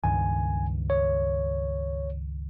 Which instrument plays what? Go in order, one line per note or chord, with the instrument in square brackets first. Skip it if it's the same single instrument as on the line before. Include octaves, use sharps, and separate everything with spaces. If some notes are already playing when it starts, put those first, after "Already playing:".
[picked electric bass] C#2 G2 D#3 [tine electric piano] G#5
[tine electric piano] C#5